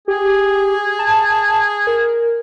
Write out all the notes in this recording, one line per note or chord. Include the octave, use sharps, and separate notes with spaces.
G4 G#4
A5
A#4